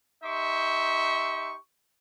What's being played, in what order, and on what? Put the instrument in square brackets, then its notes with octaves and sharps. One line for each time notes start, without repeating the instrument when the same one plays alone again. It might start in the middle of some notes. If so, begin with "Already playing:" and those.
[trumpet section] D#4 G4 E5 C6 C#6